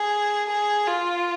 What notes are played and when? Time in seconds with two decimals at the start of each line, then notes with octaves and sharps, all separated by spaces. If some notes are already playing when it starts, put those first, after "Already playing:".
Already playing: G#4
0.50 G#4
0.87 F4